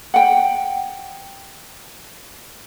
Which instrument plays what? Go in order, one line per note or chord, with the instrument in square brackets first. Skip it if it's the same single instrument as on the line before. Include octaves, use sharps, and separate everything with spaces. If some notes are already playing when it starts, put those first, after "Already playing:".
[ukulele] F#5 G5